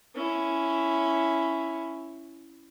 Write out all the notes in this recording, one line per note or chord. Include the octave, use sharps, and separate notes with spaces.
C#4 E4